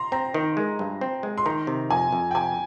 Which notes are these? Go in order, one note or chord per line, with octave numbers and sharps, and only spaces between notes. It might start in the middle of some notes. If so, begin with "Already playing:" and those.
Already playing: A#5 C6
C4 A#5
D#3
G#3
G2
C4
G#3
C6
D#3 A#5
C3
F2 G#5
F2
G5
C3 G#5